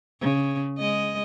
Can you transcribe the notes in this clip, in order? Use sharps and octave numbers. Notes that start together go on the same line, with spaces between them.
C#3
G#3 D#5